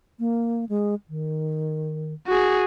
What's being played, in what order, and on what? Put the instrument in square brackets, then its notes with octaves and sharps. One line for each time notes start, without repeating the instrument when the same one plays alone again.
[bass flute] A#3
G#3
D#3
[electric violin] F#4 G#4